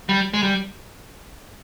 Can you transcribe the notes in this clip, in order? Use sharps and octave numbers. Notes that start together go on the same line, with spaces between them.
G3
G#3
G3